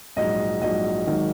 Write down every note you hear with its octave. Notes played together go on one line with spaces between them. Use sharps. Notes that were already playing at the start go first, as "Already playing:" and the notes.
A#1 G#2 F#3 D#5
A#1 G#2 F#3 D#5
G#1 G#2 D#3 F#3